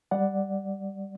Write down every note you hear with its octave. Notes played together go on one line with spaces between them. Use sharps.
G3 D5 F#5